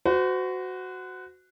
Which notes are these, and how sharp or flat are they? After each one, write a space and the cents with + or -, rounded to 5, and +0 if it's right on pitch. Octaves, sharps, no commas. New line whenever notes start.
F#4 +0 C5 -40